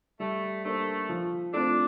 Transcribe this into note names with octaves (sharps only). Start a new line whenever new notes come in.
G3 A3
A3 A#3 D4 A4 C5
F3
A3 C4 D4 F4